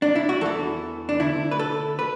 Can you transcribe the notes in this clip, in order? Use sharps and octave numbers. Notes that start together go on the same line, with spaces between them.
D4
E4
F#4
E2 E3 A4
D4
D2 D3 E4
B4
A4
B4